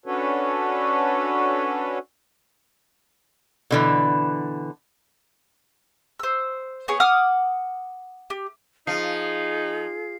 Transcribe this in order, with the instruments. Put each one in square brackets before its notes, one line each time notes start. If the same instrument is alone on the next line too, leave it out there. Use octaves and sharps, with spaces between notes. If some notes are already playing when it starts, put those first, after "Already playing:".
[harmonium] C#4 D4 F#4 A4 B4 C#5
[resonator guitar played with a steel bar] B2 D3 E3
[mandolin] C5 E6
B3 G#4 C#5
F#5 D6 D#6 F6
G4
[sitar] F3 [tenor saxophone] D#4 [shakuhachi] G#4 [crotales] C7